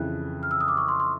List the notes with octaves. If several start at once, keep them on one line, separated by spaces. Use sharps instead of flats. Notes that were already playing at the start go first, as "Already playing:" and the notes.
Already playing: F2 C#3 E3 F#6
F6
E6
D#6
D6
C#6
C6
C6